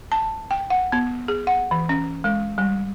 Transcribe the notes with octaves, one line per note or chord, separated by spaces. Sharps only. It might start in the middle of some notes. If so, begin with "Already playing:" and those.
A5
G5
F#5
B3
G#4
F#5
E3
C#4
G#3
G3